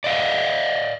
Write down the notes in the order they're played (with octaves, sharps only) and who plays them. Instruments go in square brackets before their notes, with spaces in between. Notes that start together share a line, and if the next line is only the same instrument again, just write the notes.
[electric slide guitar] D5 D#5 F5